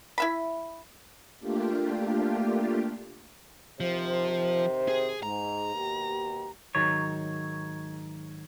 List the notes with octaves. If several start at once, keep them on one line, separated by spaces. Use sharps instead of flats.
E4 E5 B5
A3 A#3 D4 F4 G4
C3 D#3 F3 C5
G#4
G#2 A#5
D#2 B2 G4
G#2 D#3 F#3 C#5